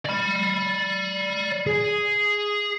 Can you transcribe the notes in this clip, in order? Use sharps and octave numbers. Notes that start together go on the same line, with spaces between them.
D5 B5
G#4